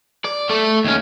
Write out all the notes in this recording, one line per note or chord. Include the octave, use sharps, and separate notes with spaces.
D5
A3 A4
D#2 C#4